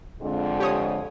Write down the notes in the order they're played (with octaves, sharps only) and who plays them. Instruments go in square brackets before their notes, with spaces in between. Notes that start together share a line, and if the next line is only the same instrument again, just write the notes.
[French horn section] F2 D3 G#3
[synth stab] G4 C#5 D#6